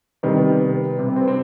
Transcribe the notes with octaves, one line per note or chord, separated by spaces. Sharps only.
C3 D#3 G3 B3
B3
C3 G3
B3
C4
C4